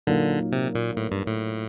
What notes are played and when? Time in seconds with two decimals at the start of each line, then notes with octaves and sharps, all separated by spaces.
0.07 A#2 D3 F#3 A#3 D#4
0.52 C3
0.75 A#2
0.97 A2
1.12 G2
1.27 A2